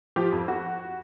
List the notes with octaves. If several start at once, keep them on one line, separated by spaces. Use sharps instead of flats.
F3 G4
F2
F#4